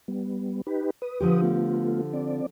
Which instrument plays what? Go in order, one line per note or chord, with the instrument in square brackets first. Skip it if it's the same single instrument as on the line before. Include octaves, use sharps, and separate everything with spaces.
[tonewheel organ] G3 B3
D#4 G4 B4
B4 D#6
[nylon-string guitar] D3 F3 G4
[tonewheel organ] A3 B3 F4
C4 D5